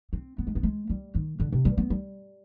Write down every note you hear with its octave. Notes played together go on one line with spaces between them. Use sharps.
C4
B3
G#3
B3
G#3
G3
D#3
D3
C3
G3
B3
G3